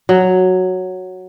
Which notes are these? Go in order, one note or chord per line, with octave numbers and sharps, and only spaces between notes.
F#3